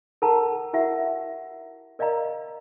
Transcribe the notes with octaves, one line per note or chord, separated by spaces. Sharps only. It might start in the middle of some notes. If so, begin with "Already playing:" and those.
A4 A#4 F#5 A5 A#5
E4 F#4 G4 A#4 E5 F#5
A#4 D5 D#5 F5 A#5